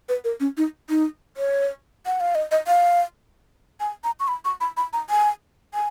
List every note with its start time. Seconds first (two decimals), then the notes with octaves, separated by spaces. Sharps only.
0.09 B4
0.24 A#4
0.40 C#4
0.57 D#4
0.90 D#4
1.37 C#5
2.06 F#5
2.20 F5
2.35 D#5
2.51 D#5
2.67 F5
3.80 G#5
4.04 A#5
4.20 C#6
4.28 B5
4.45 C#6
4.61 B5
4.77 B5
4.93 A#5
5.10 G#5
5.74 G#5